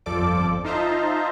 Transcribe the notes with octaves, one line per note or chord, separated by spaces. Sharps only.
G1 F2 F3 A4 D5 D6
D#4 F4 C5 E5 A5 A#5